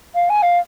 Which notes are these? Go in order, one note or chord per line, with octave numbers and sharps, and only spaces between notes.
F5
G#5
F5